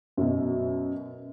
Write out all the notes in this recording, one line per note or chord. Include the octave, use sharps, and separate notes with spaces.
F#2 B2